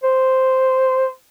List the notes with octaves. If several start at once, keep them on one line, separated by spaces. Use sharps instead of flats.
C5